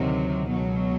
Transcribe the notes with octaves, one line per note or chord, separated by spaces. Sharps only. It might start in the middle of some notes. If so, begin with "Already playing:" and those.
Already playing: D2 C3 D#3 F#3
C#2 B2 F#3